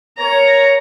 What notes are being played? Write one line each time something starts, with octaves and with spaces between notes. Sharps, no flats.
A#4 C#5 A#5